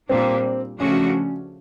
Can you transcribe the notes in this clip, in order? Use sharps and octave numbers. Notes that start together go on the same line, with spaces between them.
A#2 G3 A#3 C4 D4
C#3 F3 A3 C#4 D4 F#4